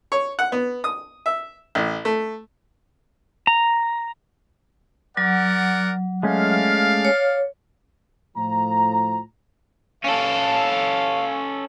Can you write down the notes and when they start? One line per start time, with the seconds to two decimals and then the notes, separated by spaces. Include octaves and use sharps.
0.12 C#5
0.39 F#5
0.52 B3
0.84 D#6
1.26 E5
1.75 A1
2.05 A3
3.47 A#5
5.17 F#3 A#4 D5 F#5
6.23 G#3 A3 C#4 D5 F5
7.05 C#5
8.37 A2 F3 A#5
10.04 C#4 A4 F5